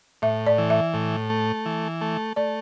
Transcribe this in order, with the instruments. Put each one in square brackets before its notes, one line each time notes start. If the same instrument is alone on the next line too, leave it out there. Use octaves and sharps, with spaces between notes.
[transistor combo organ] A2 [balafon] E5
[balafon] D5
[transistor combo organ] E3
[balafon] E5
[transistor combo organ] A2
A3
E3
A3
[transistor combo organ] A3 [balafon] D5